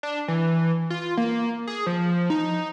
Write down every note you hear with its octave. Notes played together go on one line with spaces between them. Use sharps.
D4
E3
F4
A#3
G#4
F3
D#4